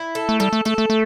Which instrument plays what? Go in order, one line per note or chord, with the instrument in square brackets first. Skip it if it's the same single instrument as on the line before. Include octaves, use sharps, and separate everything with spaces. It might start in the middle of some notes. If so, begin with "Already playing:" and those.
Already playing: [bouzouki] E4
A4
[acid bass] A3
[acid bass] G3 [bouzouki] A4
[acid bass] A3
[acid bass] A3 [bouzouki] A4
[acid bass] A3
A3